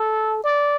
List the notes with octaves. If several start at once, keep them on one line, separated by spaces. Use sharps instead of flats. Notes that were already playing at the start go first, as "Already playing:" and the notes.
Already playing: A4
D5